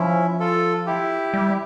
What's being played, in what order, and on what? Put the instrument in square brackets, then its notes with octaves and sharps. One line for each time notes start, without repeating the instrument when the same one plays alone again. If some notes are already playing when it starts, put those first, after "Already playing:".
Already playing: [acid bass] F3 [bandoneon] C#4 E4
[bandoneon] F4 A4
E4 G4
[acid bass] G3